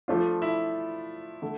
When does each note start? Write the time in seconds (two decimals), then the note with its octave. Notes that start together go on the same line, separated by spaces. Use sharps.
0.08 F3 A3 D4 F4
0.42 E4
1.42 D3 A3